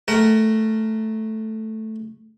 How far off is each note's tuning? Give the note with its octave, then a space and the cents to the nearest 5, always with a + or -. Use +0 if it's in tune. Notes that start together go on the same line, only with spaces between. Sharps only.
A3 +0 A#4 +0 F#5 +40